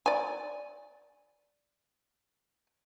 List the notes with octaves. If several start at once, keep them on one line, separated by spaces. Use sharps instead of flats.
D5 G#5